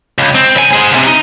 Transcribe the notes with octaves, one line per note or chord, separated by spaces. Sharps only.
C#2
C4
C#2 G#5
G#4 C5
C#2 C3
D#4